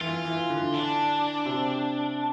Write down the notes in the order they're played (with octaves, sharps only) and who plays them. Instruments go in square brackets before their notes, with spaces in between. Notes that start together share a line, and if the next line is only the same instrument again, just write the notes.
[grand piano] E3 [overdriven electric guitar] F4
[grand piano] E3
D3
[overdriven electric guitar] D4
[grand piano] C3